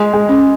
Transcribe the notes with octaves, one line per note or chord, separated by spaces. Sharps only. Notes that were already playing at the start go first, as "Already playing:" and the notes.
Already playing: G#3
G#3
C#4